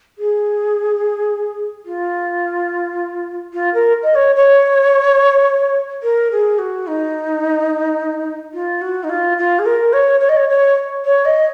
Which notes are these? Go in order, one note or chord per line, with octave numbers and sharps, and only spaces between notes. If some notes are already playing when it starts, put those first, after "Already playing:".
G#4
F4
F4
A#4
D#5
C#5
C#5
A#4
G#4
F#4
D#4
F4
F#4
D#4
F4
F4
G#4
A#4
C#5
C#5
D#5
C#5
C#5
C#5
D#5